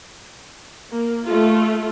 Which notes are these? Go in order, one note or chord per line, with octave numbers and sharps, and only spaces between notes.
A#3
A3 F4